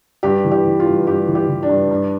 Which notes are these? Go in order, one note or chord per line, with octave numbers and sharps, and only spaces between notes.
G2 G4
E3
G4
E3
F4
G2
G2 G4
E3
G4
E3
D4
G2
G2